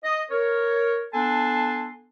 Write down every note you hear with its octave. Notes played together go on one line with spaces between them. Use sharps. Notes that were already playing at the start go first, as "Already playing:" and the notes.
D#5
A#4 C#5
B3 D4 A4 G#5 A5 C6